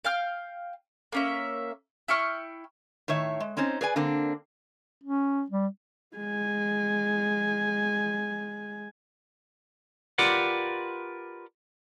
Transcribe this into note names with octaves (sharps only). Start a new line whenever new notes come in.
F5 G5 F6
A#3 C#4 E5
E4 G5 C#6 F6
A2 D#3 C#5 E5
G#3
C4 C#4 D#4 C5
G#4 B4 D5 G#5
D3 A#3 C4 D4
C#4
G3
G#3 G#5
F4 G4 A#4 B4 D5 F#5